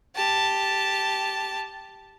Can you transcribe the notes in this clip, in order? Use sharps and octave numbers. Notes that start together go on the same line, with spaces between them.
G4 A5